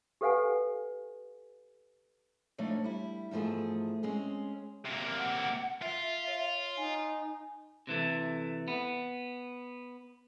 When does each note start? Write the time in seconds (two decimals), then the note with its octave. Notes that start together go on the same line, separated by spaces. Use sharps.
0.21 G4 A4 B4 F5 F#5 G#5
2.58 F#2 F3 A3 D4 D#4 C#5
2.84 G3 E4
3.31 E2 G#2 F3 A3 G#4
4.03 G#3 C4 C#4 G#4
4.85 C3 A#3
5.17 F#5
5.82 F4 E5
6.23 C#5 F5
6.77 D#4 G#5
7.87 C3 E3 A3
8.68 B3